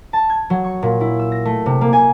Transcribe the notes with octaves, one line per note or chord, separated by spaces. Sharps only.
A5
G#6
F#3
C#6
A#2
E4
E6
A#6
A3
C3
A#3
G#5